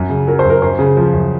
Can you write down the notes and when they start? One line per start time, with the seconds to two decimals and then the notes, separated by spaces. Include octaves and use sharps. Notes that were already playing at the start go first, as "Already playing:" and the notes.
Already playing: F#2
0.09 C#3
0.27 F#3 A#4
0.39 C5
0.45 F#2 A#4
0.62 F#2 C5
0.79 C#3
0.97 F3
1.13 F#2